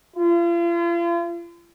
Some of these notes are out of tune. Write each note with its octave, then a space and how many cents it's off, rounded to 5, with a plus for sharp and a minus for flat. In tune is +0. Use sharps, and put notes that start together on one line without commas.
F4 -40